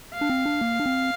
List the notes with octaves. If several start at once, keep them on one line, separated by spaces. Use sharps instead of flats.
F5
D4
C4
D4
A#3
D4
C4